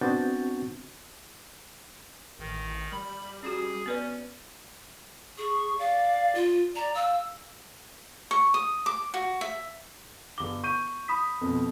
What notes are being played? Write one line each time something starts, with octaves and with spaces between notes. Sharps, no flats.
B3 C4 D4 F#4 G6 A6
A1 D#3
G3 B5
C#4 F#4 G#4
B3 C#4 B4 D5
G#4 C#6
D5 F5
F4
D5 A#5
F5 E6
C#6
D#6
D6
F#4
E5
G1 D6 G7
C#6 G6 D#7
B5 D#6 B6
F2 B2